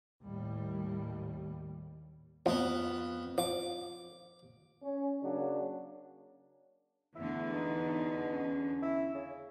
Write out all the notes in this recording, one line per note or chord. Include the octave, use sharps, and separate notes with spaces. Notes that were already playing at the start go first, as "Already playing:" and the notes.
D#2 A2 G3
F2 F3 B3
F3 D6
C#4
C#3 F#3 A#3 D4
E2 D3 A3 E4
B2 D#4
C#4
E4
C#3